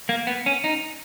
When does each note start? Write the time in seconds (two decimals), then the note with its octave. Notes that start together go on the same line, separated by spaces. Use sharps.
0.09 A#3
0.27 B3
0.46 C#4
0.64 D#4